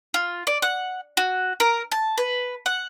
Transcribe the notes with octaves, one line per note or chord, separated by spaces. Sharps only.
F4
D5
F#5
F#4
A#4
A5
B4
F#5